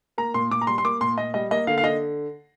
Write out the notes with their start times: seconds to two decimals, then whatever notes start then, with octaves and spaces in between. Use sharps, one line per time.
0.18 A#3 A#5
0.34 A#2 C6
0.51 A#2 D6
0.61 A#5
0.67 G3 C6
0.78 C6
0.84 A#3 D6
1.01 A#2 C6
1.18 A#2 D#5
1.34 G3 D#5
1.51 A#3 D#5
1.67 D3 F5
1.78 F5
1.83 D3 D#5